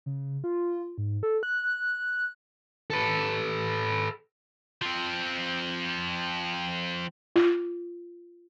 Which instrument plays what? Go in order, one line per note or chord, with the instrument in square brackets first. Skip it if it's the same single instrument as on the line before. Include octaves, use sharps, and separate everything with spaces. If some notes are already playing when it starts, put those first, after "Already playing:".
[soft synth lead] C#3
F4
G#2
A4
F#6
[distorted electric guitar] A4 B4
F3 C4
[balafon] F4